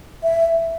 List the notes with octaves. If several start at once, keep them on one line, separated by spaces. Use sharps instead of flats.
E5